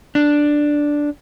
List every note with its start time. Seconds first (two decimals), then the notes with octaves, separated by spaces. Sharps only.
0.15 D4